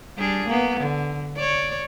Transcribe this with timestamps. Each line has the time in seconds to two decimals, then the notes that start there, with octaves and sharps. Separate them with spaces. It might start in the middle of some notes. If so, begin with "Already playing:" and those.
0.18 G3 D4 G#4
0.48 A#3 B3
0.79 D3
1.36 C#5 D5